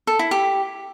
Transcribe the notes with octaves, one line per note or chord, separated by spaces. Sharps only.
A4
E4
G4